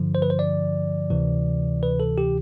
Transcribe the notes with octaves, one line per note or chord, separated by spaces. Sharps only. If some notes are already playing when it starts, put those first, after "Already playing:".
Already playing: G2 D3 F3
C5
B4
C5
D5
D2 C3 E3
B4
A4
G4